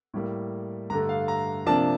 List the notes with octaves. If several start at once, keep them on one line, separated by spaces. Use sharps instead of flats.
A2 G3 A#3
G2 D3 A3 A#5
F5
A#5
C3 F3 A#3 D4 A5